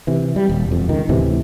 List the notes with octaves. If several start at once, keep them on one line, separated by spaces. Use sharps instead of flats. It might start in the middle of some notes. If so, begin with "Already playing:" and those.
C3 E3
G3
D#1
E1 F2
C#2 D#3
D2 A2 C3 E3